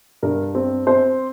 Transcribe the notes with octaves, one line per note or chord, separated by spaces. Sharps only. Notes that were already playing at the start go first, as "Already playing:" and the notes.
G2 A#4
C4
C4 C5